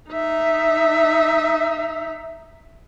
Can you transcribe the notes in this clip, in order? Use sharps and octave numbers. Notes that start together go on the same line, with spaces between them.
D#4 E5